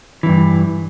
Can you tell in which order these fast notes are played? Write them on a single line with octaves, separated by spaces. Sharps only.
E3 E2 G2